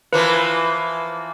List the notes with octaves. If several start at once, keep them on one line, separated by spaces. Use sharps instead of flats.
E3 F3 A#3 B4